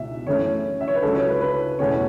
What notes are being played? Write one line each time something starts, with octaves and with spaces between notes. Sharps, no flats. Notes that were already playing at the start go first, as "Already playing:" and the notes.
Already playing: C#2 B2 E5
F#2 E3 A3 C#4 C#5
E5
C#5
B4
C#2 C#3 F#3 C#4 A4
C#5
B4
B4
E2 B2 A3 C#4 C#5